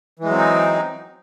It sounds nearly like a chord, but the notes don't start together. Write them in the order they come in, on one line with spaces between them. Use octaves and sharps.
E3 G#3 F#3 C4 D#4